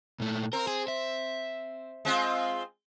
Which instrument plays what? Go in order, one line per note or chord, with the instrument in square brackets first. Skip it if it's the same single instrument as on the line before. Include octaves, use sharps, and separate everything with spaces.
[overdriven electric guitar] A#2 A3
[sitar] C4 [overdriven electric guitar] A#4
[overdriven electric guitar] G#4
E5
[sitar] G#3 C4 F4